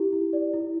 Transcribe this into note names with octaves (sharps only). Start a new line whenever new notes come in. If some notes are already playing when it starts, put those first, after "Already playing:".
Already playing: E4 G4
E4
D5
E4